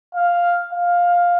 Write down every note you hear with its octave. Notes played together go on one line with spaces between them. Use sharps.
F5
F5